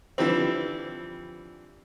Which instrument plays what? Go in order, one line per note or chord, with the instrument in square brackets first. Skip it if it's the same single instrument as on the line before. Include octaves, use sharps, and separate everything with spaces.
[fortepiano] D3 E3 F3 G3 C4